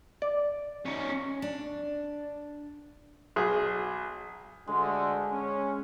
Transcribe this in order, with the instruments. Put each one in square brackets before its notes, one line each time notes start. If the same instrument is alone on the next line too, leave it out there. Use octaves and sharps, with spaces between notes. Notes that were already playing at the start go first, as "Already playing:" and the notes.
[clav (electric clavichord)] D5
[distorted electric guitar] C#4 D#4
[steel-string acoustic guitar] D4
[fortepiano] B1 G#4
[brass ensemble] D2 D3 [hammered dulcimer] G#3
[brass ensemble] C#4